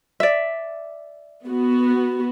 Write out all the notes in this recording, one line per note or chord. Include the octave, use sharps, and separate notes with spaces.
D5 E5
B3 F#4